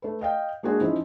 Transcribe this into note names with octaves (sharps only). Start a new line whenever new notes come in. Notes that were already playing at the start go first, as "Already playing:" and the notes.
A3 B4
D#5 F5 G5
G#3 A#3 D4 F#4 G#4
F3 C#4 D#4 E4 D#5